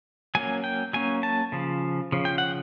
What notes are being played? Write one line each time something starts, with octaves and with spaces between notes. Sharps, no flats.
F#3 A#3 C#4 G#5
G5
F#3 A#3 C#4 G#5
A5
C#3 F3
C#3 F3
G5
F#5